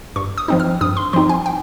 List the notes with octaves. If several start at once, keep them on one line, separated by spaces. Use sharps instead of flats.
G2 C#6
D#6
F3 C4 D#4
F6
G2 D#6
C6
F3 C4 D#4 C6
G#5
G5